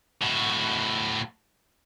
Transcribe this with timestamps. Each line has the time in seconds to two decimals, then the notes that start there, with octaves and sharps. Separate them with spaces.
0.22 A2 F#4